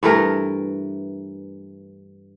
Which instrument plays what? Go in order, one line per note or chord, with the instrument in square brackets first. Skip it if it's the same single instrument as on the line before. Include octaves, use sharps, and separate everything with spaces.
[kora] G2 E3 A3 A#4